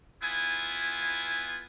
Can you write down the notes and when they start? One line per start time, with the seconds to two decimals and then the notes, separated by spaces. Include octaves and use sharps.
0.22 B3 E4 F4 G#5